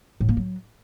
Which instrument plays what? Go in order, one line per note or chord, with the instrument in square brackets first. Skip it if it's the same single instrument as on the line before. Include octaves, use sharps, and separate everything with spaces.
[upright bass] A2
A#3
F#3